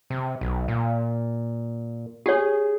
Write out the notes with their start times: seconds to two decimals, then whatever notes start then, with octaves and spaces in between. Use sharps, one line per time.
0.10 C3
0.41 B1
0.68 A#2
2.26 G4 G#4 C#5